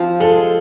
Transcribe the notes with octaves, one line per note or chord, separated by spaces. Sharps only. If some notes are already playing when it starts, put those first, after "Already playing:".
Already playing: F3 C4
G#3 A4